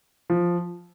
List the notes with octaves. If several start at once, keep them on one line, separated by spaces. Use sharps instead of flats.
F3